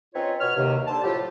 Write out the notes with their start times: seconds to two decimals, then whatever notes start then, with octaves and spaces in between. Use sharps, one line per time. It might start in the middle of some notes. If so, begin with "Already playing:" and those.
0.14 C4 C#4 D#4 F4 B4 C#5
0.41 B2 C#5 F6
0.57 D#2 C3
0.87 D3 C5 A5
1.03 A2 F3 F#3 F4 G4